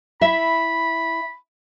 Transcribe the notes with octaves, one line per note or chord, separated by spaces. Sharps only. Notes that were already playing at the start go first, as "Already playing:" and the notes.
E4 E5 B5